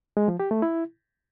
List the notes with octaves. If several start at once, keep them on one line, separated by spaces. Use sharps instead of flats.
G#3
F3
G4
A3
E4